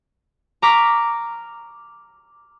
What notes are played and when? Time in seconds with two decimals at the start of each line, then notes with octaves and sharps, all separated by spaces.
0.62 A#5 C#6 D6 F6 B6